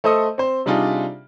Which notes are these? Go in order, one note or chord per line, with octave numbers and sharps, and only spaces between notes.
A3 A4 C5 D#5 D#6
C4 C5
C3 G3 D4 D#4 F4 G#4